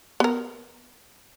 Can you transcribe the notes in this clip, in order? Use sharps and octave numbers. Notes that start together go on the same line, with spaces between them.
B3 A#4